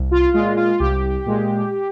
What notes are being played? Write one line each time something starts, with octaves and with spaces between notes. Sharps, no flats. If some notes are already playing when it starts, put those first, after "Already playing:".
Already playing: C2
F4
A#2 G#3 F4
F4
C2 G4
A#2 G#3